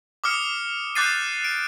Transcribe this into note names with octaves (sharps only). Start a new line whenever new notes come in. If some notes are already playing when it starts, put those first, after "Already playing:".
D6 D#6 F6 C#7
D6 F#6 G6 A6 C7 D#7
D7